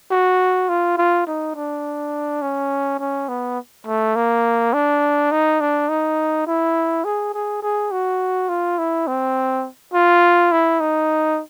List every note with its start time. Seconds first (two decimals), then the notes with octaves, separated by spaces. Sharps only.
0.11 F#4
0.69 F4
0.98 F4
1.27 D#4
1.55 D4
2.42 C#4
2.99 C#4
3.28 B3
3.87 A3
4.16 A#3
4.73 D4
5.32 D#4
5.61 D4
5.89 D#4
6.47 E4
7.05 G#4
7.34 G#4
7.62 G#4
7.91 F#4
8.49 F4
8.78 E4
9.07 C4
9.94 F4
10.52 E4
10.80 D#4